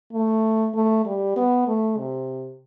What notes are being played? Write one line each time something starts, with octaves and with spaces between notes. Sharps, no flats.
A3
A3
G3
B3
A3
C3